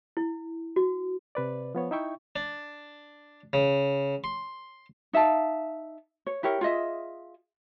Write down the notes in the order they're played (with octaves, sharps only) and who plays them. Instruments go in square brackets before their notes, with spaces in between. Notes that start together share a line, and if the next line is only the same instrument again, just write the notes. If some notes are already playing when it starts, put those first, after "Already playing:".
[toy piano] E4
F#4
[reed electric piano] C3 B4 D5
F3 B3 C#5
D#4 E4 E5 G5 C#6
[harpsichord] D4
C#3
C6
[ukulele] D#4 E5 F5 A5
C#5
E4 G4 A#4 C#5
F4 G#4 D#5 E5